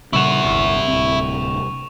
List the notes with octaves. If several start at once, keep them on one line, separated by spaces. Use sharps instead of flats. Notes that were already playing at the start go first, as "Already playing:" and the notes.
A#2 C#3 G3 E4 F#5 C#6 E7 F7
D1 G1 C2
D1 G#1 C4